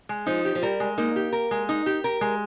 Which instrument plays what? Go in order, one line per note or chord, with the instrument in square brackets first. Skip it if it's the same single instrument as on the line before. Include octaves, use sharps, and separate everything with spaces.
[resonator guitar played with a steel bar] G#3
[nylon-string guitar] F3 [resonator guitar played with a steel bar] D#4
[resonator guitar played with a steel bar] G4
[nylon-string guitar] F3
[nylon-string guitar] G3 [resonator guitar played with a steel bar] A#4
[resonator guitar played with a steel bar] G#3
[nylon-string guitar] A#3 [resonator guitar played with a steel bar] D#4
[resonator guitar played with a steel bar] G4
A#4
G#3
D#4
G4
A#4
G#3